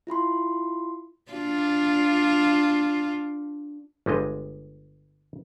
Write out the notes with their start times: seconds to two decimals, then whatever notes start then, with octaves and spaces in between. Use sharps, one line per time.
0.07 E4 F4 B5 C6
1.31 D4 F4
4.06 G1 G3 G#3 D#5